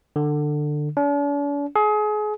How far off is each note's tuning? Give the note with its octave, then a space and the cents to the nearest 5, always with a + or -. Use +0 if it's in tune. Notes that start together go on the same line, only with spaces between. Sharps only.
D3 +20
D4 -45
G#4 +30